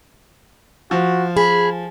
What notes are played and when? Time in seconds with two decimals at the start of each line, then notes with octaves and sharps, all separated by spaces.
0.91 F3 F#4
1.37 G#4 B5